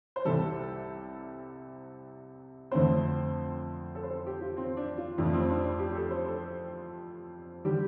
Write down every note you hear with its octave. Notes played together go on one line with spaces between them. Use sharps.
C5
C2 C3 G3 A4
F2 D3 A3 C4 C5
A4
C5
A4
G4
F4
C4
D4
F4
F1 F2 F3 A3 D4
C4
D4
D4
G4
G4
A4
C5
A4
D3 G3 G4